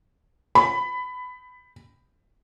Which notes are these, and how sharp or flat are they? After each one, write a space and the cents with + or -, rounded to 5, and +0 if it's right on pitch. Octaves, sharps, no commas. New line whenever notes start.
B5 +15